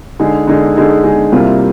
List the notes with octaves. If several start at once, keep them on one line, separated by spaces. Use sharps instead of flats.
D3 G#3 D#4 G#4
D3 G#3 D#4 G#4
D3 G#3 D#4 G#4
D3 G#3 D#4 G#4
C2 C3 G3 A#3 F4